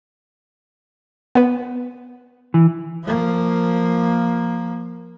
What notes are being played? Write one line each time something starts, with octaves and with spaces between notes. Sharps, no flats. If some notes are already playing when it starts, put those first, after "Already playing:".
B3 B4
E3
F3 A#3